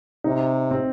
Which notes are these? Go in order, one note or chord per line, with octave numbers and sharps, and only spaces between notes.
C3 D#4
C4